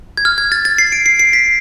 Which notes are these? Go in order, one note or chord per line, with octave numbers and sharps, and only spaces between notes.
G#6
F6
G#6
A6
A6
C7
D7
C7
C7
B6